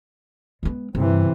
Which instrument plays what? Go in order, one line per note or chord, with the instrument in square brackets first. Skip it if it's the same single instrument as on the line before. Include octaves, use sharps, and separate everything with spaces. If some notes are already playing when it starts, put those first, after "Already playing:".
[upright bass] G#3 B3
[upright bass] G2 [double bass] C3 E3